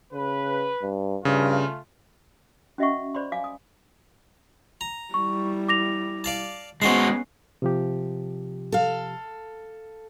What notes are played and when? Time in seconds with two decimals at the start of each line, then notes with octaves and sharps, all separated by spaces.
0.14 C#3 B4
0.82 G2
1.25 G2 C#3 A3 F4
2.78 C#4 F#4 D#5 E5 F#5 C#6
3.15 C5 D5 B5 C6
3.32 F5 G#5 D6
3.44 D#6
4.81 A#5
5.14 G3 E4 C#6
5.69 D6 A#6 F7
6.24 D5 F5 A5
6.82 G#3 B3 C#4 F#4 C5 D#5 A5 C7
7.62 C3 F3 G4
8.72 A4 F5